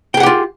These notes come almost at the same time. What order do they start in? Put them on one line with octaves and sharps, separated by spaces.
G5 G#4 F#5 G4 F4